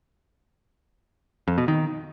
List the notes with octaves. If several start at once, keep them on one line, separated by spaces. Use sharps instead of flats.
F2
B2
D#3